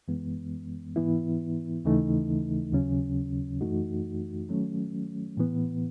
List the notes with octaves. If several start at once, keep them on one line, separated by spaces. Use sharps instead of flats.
F#2 E3 G#3 B3
G#2 E3 B3 E4
D#2 C#3 E3 A3 D#4
D#2 C#3 F#3 C#4
F#2 E3 A3 D#4 F#4
D#3 F#3 A3 C#4
A2 E3 B3